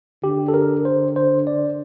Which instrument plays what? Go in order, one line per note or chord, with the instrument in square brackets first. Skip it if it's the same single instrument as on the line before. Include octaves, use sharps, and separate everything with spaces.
[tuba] D3 [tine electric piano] G4
[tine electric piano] A4
A#4
C5
C5
D5